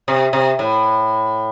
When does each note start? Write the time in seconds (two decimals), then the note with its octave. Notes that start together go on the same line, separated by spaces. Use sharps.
0.08 C3
0.33 C3
0.59 A2